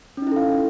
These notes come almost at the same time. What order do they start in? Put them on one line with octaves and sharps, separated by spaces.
C#4 D#4 E4 A4 F5